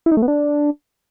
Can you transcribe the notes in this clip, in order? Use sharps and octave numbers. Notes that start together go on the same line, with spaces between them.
E4
D#4
A3
B3
D4